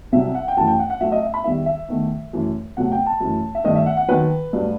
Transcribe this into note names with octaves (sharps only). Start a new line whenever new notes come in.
C2 C3 F#3 E5
F#5
G5
F#2 E3 A3 A5
G5
F#5
F#5
A2 F#3 A3 E5
D#5
E5
B5
E2 D#3 G3 E5
E5
E2 D#3 A3
F#2 E3 A3
E2 C3 F#3 A3 F#5
G5
A5
F#2 E3 A3
E5
G2 D#3 A3 D#5
E5
F#5
F#5
D#2 D#3 F#3 B4
G2 F#3 A3